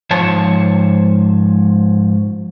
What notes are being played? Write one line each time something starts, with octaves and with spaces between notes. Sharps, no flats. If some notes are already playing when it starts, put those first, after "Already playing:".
G#2 F3 C5 C#5 A5